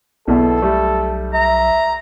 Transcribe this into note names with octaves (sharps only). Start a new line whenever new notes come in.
B1 E2 B2 A4
G3 A3
E5 A#5